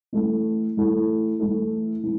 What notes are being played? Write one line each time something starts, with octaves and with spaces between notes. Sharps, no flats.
E3 A3 E4 A4
E3 A3 E4 A4
E3 A3 E4 A4
E3